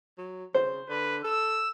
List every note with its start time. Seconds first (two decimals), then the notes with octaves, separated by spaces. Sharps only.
0.18 F#3
0.54 C#3 C5
0.89 D3 B4
1.24 A4 E6